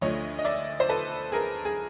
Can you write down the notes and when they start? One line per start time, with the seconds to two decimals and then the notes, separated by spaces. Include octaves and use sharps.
0.01 D2 D3 F3 A3 C#5 D#5
0.39 D#5
0.45 D5 E5
0.80 C5
0.89 A4 B4
1.32 G#4 A#4
1.65 G#4